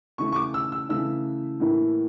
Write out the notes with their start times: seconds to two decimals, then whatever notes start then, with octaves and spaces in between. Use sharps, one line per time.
0.18 C#3 E3 A3 E4 C#6
0.32 C#6
0.36 D6
0.54 E6
0.72 E6
0.89 C#3 E3 A3 E4 E6
1.60 A2 E3 A#3 E4